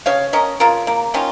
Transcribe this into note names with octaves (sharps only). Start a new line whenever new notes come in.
C#3 C#5 F5
C#4 A#4 D#5
C#3 F4 A#4
A#3
D#3 C#4 F4